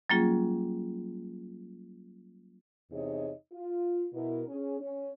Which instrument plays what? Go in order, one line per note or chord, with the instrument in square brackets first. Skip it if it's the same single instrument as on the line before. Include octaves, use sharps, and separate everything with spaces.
[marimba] F#3 G3 A#3 C#4 F4 G#4
[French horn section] E2 C3 D#4 G#4 C#5 D#5
F4
B2 E4 A#4
C#4 G#4
C#4